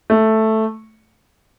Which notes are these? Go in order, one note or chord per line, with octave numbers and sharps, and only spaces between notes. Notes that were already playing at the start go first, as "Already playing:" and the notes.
A3